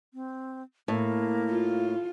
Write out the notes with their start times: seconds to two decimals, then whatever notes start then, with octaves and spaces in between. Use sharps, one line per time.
0.14 C4
0.88 A2 A#3
1.51 F4